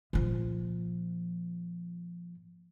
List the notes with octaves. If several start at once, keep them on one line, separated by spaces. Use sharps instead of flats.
A#2 F3